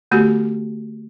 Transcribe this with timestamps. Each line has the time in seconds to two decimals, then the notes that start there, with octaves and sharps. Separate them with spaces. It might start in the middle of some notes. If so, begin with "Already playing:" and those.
0.11 D3 A3 B3 F#4 G4